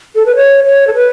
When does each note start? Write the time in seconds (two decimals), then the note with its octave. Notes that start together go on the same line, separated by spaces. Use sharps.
0.15 A4
0.26 B4
0.36 C#5
0.65 C#5
0.87 A4
0.95 B4